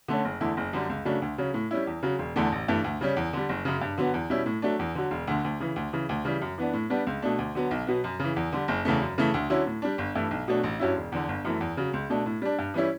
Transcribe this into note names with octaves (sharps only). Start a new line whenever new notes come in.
D3 A3 C#4
F#1
E2 D3 A3 E4
F#1
F#2 D3 G3
C#2
C#3 F#3 A3 D4
D2
C#3 F#3 C#4
A2
G3 C#4 E4
E2
C#3 F#3
E1
E2 D3 A3
A1
G2 E3 A3
D2
C#3 G3 C#4
E2
D3 G3
F#1
F#2 C#3
G2
D3 F#3 B3
E2
B2 G3 C#4 E4
A2
F#3 A3 D4
E2
D3 F#3
E1
D2 D3
D2
C#3 E3
D2
C#3 E3
D2
C#3 E3 G3
F#2
E3 B3 D4
A2
G3 B3 D4
C#2
B2 A3 D4
D2
D3 F#3 B3
B1
B2 F#3 B3
F#2
C#3 E3
E2
D3 G3
F#1
E2 C#3 E3 A3
F#2
C#3 E3 A3
D2
D3 F#3 C#4 E4
A2
G3 D4
G1
G2 E3 A3 E4
B1
B2 F#3 A3 D4
A1
G2 F#3 C#4 E4
E1
E2 D3
G1
F#2 E3 A3
E2
C#3 F#3
C#2
B2 A3 D4
A2
G3 D4
G2
E3 G3 C#4 E4